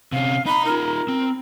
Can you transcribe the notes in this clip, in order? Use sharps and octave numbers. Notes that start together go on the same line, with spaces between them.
C3 C#4 F5
D#4 A#5 B5
D#4 F4 A#4
C4